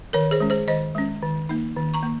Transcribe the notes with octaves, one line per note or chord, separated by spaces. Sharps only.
D#3 A#4 C#5
G#4 C5
G#3 C#4
G#4 C5
D#3 C5 D#5
G#3 C#4
D#3
A#3 D#4
D#3
A#5 C#6
A#3